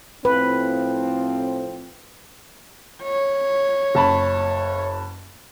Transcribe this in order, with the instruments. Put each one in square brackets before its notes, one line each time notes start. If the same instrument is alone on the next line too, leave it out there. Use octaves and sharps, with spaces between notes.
[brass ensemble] A2 F3 C4 [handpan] B4
[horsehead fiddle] C#5
[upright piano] F#1 A5 B5